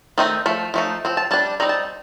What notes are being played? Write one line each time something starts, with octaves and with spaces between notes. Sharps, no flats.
D#3 A3 C4 D#4
F3 A3
F3 A3 D#4
F3 C4
A5
G3 D4 A5
G3 C4 D#4 A#5
A5